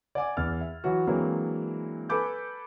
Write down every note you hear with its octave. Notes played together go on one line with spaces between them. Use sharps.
D5 F#5 G#5 D6
E2 F6 A6
E5
E3 F#3 F#4
E3 F#3 G#3 A#3 C4 D4
A4 B4 G#5 B5 D6 G6